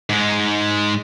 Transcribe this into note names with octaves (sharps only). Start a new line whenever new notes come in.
G#2 G#3